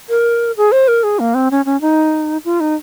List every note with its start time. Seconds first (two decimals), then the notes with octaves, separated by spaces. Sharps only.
0.09 A#4
0.57 G#4
0.72 C5
0.88 A#4
1.04 G#4
1.19 A#3
1.34 C4
1.51 C#4
1.65 C#4
1.81 D#4
2.45 F4
2.60 D#4